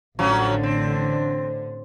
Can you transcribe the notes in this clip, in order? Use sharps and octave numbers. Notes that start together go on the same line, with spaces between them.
A1 D3 F3 F#3 C#4
C4